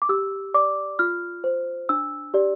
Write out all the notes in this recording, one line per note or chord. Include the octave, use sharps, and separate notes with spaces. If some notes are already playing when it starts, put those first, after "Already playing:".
D6
G4 E6
D5 D6
F4 F6
C5
D4 E6
G4 D5